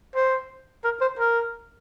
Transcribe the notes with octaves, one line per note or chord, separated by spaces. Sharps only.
C5
A#4
C5
A#4